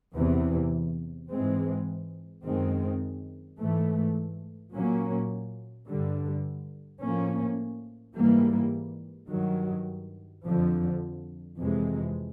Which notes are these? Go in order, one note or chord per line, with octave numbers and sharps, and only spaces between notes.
E2 C3 E3
G#2 E3 G#3 C4
F#2 D#3 G#3 C4
G#2 E3 A3
A#2 F#3 A#3 C#4
G2 D3 G3
A2 F3 A#3 C#4
G#2 E3 G3 A#3
G2 D#3 F#3
F2 D3 F3
F2 C3 E3 G#3